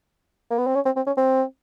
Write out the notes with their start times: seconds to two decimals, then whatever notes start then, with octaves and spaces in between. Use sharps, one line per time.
0.50 A#3
0.58 B3
0.66 C4
0.75 C#4
0.85 C4
0.96 C4
1.06 C#4
1.17 C4